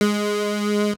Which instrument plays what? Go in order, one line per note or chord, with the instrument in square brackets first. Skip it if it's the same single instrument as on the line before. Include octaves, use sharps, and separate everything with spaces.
[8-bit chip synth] G#3